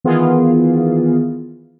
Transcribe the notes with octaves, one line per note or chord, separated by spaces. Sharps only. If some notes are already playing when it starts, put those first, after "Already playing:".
D#3 E3 B3 F4 G#4